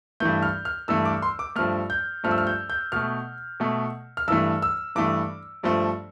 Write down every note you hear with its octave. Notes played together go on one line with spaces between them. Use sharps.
G2 E3 A3 G6
F6
F6
G2 E3 A3 E6
D6
C6
D6
G2 F3 A3 F6
G6
G2 F3 A3 F6
E6
F6
G6
G6
B2 A3 F6
B2 A3
F6
G2 E3 A3 E6
E6
G2 E3 A3 D6
G2 F3 A3